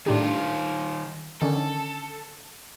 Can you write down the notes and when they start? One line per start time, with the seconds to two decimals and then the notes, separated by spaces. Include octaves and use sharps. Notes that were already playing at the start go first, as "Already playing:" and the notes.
0.06 A2 D#3 D4 F4 G4
1.42 D3 D#3 C#4 A4